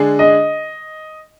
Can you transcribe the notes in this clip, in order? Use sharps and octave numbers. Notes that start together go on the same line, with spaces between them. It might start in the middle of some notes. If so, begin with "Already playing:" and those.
Already playing: D3 G#3 D4 G#4
D#5